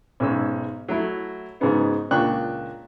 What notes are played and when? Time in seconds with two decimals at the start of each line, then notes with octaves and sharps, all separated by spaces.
0.20 B1 G#2 C#4 E6
0.88 F#3 A3 E4
1.60 G#2 C#3 F#3 B3 D#4
2.11 C#2 A#2 D4 G5 C#6 F#6